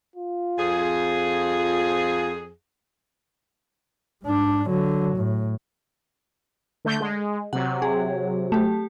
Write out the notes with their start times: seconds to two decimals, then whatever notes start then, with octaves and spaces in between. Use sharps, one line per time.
0.16 F4
0.58 F2 G#4
4.23 G#2 D4
4.69 D3 F#3
5.17 A2
6.85 D3 A3 G6
7.00 G#3
7.53 C3 F#3 F#5
7.82 G#4
8.52 A3 G4